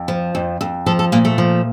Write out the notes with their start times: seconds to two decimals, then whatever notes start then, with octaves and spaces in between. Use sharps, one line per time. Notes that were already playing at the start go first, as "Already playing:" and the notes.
Already playing: F2
0.08 F3
0.35 F2
0.61 F2
0.86 F3 A4
0.99 A4
1.12 A#2 A#3
1.25 A3
1.38 F3